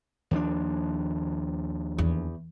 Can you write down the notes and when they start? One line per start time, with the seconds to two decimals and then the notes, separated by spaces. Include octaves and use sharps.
0.31 D#2 F3 D4
1.98 E2